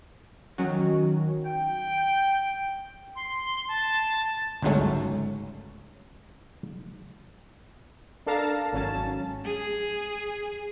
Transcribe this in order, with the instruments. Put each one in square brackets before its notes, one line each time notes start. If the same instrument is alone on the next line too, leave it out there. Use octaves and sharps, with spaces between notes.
[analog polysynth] D#3 F#3 C#4 F#4
[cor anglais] G5
[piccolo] C6
A5
[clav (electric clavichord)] G1 C#2 G#2 F#3 A3 C#4
[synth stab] D4 A4 A#4 F5 A5 A#5
G#1 F#3 C#4 A5
[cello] G#4